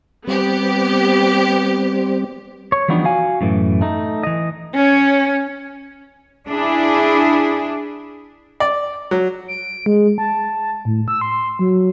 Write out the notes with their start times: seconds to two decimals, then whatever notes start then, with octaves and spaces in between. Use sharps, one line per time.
0.27 G3 B3 C4 G4
2.72 C#5
2.89 E3 F3 G3 B3 D4 D#4
3.04 F#4 F5 G#5
3.41 F#2 A2 E3
3.81 A3 D#4
4.23 E3 D#5
4.75 C#4 C#5
6.49 D4 E4 G#4
8.60 D5
9.11 F#3
9.48 D7
9.86 G#3
10.18 A5
10.85 A2
11.08 E6
11.21 C6
11.59 F#3